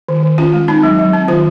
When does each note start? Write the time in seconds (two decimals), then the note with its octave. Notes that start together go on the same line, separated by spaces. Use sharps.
0.09 D#3
0.23 D#3
0.38 C#4 F4
0.53 G#3
0.68 C4 D#4
0.83 F#3
0.98 F#3
1.13 C4
1.28 D#3 F4